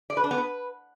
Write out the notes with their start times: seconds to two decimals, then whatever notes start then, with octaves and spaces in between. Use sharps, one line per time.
0.10 D5
0.17 B4
0.24 D4
0.31 B3
0.38 B4